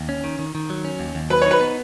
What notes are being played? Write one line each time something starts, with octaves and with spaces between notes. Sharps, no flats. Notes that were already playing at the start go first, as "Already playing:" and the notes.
Already playing: D#2
C#4
D#3
D#3
D#3
F#3
C#4
D#2
D#2
F#3 B4
D#4 C#5
B4
B3